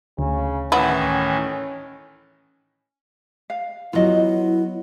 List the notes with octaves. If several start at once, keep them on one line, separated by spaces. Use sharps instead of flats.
D2 C#3
A2 D#3 E3 B3 C#4 E4
F5
F#3 B3 E4 F4 D#5